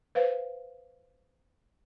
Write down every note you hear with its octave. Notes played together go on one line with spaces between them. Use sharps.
B4 C5 F5